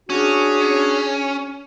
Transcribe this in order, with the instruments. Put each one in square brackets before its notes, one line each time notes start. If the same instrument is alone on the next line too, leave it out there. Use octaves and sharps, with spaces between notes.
[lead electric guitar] C#4 [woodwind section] D4 F#4 G#4